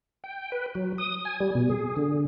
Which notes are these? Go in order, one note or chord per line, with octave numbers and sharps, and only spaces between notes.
G5
B4
F#3
D#6
G#5
G3
B2
G#4
D3